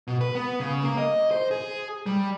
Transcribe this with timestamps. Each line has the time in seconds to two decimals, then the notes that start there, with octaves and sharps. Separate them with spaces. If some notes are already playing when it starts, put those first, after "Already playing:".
0.07 B2
0.21 B4
0.35 B3
0.60 C#3
0.83 A#3
0.98 D#5
1.31 C5
1.51 G#4
2.06 G3